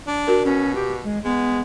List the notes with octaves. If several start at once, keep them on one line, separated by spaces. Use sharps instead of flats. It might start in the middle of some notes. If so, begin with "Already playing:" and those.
D4
F#4 A#4
B2 C#4
G4
G#3
G#3 B3